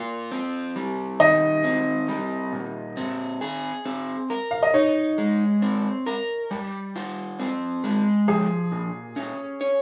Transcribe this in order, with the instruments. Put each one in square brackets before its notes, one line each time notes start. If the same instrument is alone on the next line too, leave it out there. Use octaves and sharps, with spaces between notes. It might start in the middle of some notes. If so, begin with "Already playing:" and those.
Already playing: [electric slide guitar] A#3 F4
C4
G3
[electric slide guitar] D#3 [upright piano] D#5
[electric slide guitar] C4
G3
A#2
C4
G#4
C4
A#4
[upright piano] F5
D#5
[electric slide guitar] D#4 [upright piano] C#5
[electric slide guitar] G#3
C4
A#4
G3
F4
C4
G#3
[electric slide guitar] F3 [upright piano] G#4
[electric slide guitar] A#2
C#4
C#5